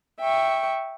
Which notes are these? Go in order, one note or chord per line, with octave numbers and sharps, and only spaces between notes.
E5 G5 C#6